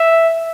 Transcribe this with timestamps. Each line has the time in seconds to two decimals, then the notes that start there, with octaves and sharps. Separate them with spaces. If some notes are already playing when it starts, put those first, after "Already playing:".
Already playing: E5